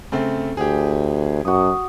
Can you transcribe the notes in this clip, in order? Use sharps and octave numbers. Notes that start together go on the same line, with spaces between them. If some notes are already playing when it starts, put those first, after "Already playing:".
C#3 A3 C4
D2 G4 G#4
F#2 F#4 D#6